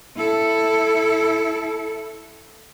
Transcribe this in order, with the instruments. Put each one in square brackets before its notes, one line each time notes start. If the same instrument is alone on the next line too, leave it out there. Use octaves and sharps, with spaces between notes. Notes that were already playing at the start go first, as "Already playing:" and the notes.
[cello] E4 A4